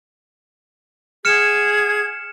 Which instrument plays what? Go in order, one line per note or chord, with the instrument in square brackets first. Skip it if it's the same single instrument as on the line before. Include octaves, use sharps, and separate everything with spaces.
[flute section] G#4 F#5 G#6 [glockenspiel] F6 C#7 E7